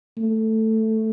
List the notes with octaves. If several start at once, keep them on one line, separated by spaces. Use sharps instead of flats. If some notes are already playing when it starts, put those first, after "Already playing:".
A3